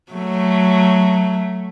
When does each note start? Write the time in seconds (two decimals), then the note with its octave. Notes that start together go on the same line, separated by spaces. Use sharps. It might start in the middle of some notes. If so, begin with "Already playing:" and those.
0.12 F#3 A3